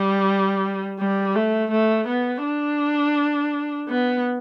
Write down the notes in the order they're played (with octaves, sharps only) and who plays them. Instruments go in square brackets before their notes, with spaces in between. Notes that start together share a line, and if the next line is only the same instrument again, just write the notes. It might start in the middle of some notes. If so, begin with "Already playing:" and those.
Already playing: [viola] G3
G3
A3
A3
B3
D4
B3